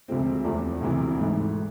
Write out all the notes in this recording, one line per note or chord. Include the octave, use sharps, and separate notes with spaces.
D2 C3 F3 G#3 C4
E2 C3 F3 A3 D4
E1 D2 C3 E3
G#1 G#2 E3 A3